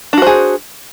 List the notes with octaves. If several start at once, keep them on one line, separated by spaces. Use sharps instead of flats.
D4 F#4 G#4 C5